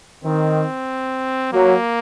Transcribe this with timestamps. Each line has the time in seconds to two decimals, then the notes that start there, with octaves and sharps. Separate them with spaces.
0.24 D#3 C4
1.53 F#3 A#3